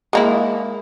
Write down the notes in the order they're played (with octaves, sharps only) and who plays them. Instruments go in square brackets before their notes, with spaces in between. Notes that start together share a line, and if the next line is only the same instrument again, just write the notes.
[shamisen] G#3 A#3 E4